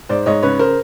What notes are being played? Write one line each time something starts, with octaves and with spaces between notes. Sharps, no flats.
G#2 C5 D5
G#2 C#5 D#5
C#3 B4 C#5
A#4 C5